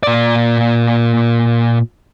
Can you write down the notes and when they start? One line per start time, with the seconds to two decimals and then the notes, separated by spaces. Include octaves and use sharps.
0.03 A#2 D5